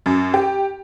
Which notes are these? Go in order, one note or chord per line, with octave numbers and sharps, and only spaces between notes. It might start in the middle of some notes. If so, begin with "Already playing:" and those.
F#2
G4